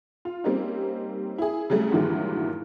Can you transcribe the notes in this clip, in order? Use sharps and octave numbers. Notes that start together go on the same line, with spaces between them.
F4
G3 A#3 C4 C#4 D#4
E4 G#4
C#3 F#3 G3 A3
G2 A#2 D#3 E3 F#3 G#3